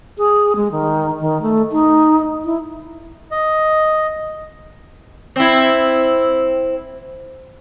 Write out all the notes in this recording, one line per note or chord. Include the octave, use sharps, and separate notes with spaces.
G#4
G#3
D#3
D#3
A3
D#4
E4
D#5
C4 E4